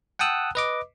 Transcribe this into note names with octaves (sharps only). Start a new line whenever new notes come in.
F#5 G5 A5 D#6 E6 F#6
B4 D#5 D6